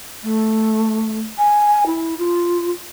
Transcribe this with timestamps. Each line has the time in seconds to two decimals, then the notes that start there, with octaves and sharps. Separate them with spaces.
0.23 A3
1.38 G#5
1.86 E4
2.18 F4